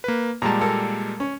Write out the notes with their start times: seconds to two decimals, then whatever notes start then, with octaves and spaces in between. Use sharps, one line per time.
0.04 A#3 B4
0.42 A#2 G3 G#3 A5 A#5
0.61 A#3 A4 A#4
1.20 C#4